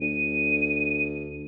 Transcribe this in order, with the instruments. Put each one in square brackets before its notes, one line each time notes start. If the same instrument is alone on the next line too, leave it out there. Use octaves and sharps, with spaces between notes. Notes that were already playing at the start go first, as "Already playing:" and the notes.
[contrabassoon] D2 [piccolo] D#7